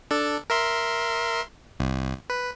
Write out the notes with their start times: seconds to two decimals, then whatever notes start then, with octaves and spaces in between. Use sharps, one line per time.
0.11 D4 A4
0.50 A#4 E5 C6
1.80 C2
2.30 B4